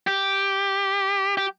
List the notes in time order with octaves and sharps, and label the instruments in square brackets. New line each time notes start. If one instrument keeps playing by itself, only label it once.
[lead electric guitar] G4
G4